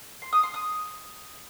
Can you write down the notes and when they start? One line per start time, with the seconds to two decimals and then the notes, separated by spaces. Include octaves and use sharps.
0.22 C6
0.33 D#6
0.43 C6
0.54 D#6